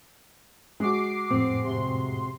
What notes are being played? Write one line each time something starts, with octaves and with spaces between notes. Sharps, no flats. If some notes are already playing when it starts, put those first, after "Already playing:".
G#3 F#4 D6 C7
F2 A2 C4
C3 C6